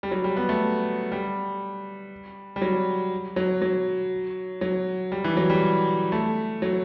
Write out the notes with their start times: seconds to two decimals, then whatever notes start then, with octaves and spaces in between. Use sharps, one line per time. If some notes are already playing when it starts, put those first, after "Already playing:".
0.03 G3
0.11 F#3
0.24 G3
0.37 B3
0.49 A3
1.12 G3
2.56 G3
2.62 F#3
3.36 F#3
3.61 F#3
4.61 F#3
5.12 G3
5.24 E3
5.37 F#3
5.50 G3
6.12 A3
6.62 F#3